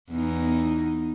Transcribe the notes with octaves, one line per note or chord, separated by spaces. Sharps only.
E2 D#4